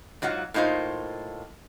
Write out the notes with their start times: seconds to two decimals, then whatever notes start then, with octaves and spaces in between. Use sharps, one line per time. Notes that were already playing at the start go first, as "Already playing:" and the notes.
0.22 G#2 F#3 F4 F#5
0.54 A2 A#3 D#4 F4 C5